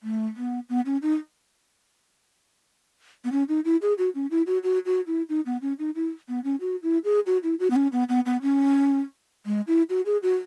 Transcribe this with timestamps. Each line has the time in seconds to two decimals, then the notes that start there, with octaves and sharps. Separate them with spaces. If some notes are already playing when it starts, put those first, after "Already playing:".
0.03 A3
0.37 B3
0.69 B3
0.86 C#4
1.02 D#4
3.24 B3
3.32 C#4
3.49 D#4
3.65 E4
3.82 G#4
3.98 F#4
4.15 C#4
4.31 E4
4.47 F#4
4.63 F#4
4.86 F#4
5.07 E4
5.29 D#4
5.46 B3
5.62 C#4
5.79 D#4
5.95 E4
6.28 B3
6.44 C#4
6.61 F#4
6.83 E4
7.05 G#4
7.26 F#4
7.43 E4
7.60 F#4
7.70 B3
7.76 C#4
7.92 B3
8.09 B3
8.26 B3
8.42 C#4
9.46 G#3
9.67 E4
9.90 F#4
10.06 G#4
10.23 F#4